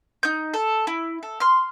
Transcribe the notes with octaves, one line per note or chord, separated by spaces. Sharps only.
D#4 G6
A4
E4
A4
C6 F6